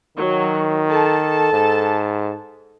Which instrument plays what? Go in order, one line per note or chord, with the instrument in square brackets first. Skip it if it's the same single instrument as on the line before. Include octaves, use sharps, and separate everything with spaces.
[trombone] D#3 [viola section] F#3
[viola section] A4 A5
[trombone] G#2